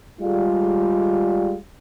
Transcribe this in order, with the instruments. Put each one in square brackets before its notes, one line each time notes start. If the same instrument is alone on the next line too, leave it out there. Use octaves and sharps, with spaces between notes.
[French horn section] G3 G#3 F4